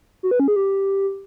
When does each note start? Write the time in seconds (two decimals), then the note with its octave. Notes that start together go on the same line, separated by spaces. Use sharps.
0.23 F#4
0.31 B4
0.40 C#4
0.48 G#4
0.56 G4